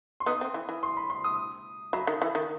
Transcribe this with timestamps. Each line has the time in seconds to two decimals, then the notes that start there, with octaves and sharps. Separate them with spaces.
0.20 C6
0.26 B3 D#4 D#6
0.41 C4
0.54 E3
0.69 E3
0.83 C6
0.97 B5
1.10 C6
1.24 D#6
1.93 F#3 B5
2.07 D#3
2.22 E3
2.35 D#3